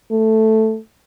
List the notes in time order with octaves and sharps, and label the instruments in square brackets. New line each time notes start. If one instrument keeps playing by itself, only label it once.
[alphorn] A3